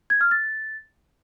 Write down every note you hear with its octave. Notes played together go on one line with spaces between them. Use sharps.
G#6
F6
A6